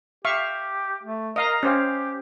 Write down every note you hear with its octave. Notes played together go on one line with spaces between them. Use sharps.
G4 E5 F5 C#6
A3
A#4 D#5 F5 A#5
C#4 G4 C5 F5